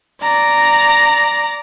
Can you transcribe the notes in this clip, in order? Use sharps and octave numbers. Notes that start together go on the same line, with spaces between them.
D5 A#5